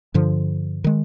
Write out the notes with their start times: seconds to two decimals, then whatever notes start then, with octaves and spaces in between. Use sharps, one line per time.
0.14 G2 D3 F3
0.84 D#3 G#3